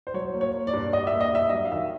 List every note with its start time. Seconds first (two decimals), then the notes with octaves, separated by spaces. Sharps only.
0.07 C5
0.14 F#3 C#5
0.34 A#3
0.41 C#5
0.53 A#3
0.67 D5
0.73 G2
0.93 G2 D#5
1.07 E5
1.12 A#3
1.21 D#5
1.33 G2 E5
1.50 F#3 D#5
1.65 F5
1.71 D#3 E5